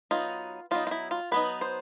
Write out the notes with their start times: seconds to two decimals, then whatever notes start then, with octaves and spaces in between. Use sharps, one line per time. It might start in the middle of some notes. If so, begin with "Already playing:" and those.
0.11 F#3 B3 D#4 F4
0.71 F#3 B3 D#4 F4
0.87 F4
0.91 E4
1.11 F4
1.31 F#3 B3 D#4 B4
1.61 C5